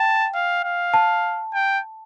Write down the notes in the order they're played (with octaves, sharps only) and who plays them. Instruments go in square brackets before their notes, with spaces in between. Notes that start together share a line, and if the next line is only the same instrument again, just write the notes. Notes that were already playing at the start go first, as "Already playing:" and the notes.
Already playing: [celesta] G5 [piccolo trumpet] A5
[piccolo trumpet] F5
F5
[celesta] A5
[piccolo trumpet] G5